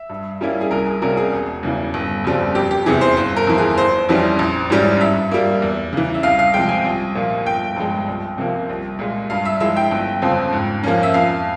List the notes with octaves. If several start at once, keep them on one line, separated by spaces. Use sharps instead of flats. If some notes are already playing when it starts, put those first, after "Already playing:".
Already playing: E5
G2
G3 A#3 C#4 E4
G#4
C2 A#4
G#4
C3 G3 A#3 C#4 A#4
G#4
E1
E2 C#3 E3
G1
F2 C#3 G3 C4
F1 G4
G4
E2 C3 E3 G#4
C5
G1 C5
A#4
F2 E3
G#4
F1 C5
F2 E3 G3 C#4
A#1
G#2 E3 G3 C#4
G2 E5
G3 A#3
E2
C#3 E3
E5
C2 F5
F5
C3 F3 G#3 G5
G#5
C2
A#2 F3 A#3
G1 G5
G2 F3 G#3
C2
C3 F3 A#3
C2
A#2 G#3
G2 F5
E5
F3 G#3 E4 E5
G5
G1
F2 C#3 F3 C4
G#2
F3 A#3 C#4
E5
F2 F5